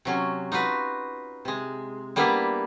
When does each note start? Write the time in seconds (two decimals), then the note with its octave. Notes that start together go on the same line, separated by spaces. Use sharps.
0.05 C3 F#3 C#4
0.52 D#4 F4 F#4 B4
1.45 C3 G#3
2.16 G3 A#3 B3 D4 E4 B4